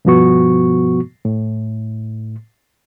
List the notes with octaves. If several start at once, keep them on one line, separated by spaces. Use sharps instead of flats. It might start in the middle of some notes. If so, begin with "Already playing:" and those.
G2 B2 F3 B3 F#4 C#6
A2